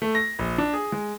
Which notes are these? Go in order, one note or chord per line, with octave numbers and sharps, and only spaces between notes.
A3
A#6
A#1
D4
G#4
G#3